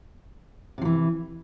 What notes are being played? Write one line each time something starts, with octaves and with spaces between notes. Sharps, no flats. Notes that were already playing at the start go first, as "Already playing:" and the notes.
C3 E3 F3